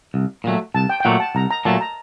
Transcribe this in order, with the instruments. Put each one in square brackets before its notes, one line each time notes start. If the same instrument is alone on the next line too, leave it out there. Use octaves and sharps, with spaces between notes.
[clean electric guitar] C2
A#2 F#3 A3
[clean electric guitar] C2 [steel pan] A5
[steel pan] G5
G5
[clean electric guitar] A#2 F#3 A3 [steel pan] F#5
[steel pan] A5
[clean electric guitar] C2 [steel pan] A#5
[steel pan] A#5
[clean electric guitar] A#2 F#3 A3 [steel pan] A5
[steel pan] A#5